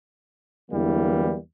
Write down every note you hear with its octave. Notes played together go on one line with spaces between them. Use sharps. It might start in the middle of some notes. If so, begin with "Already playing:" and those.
E2 D3 E3 F#3 G3 A#3